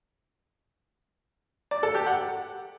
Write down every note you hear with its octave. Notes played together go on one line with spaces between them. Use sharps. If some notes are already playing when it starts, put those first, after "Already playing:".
D5
A4
G4
F#5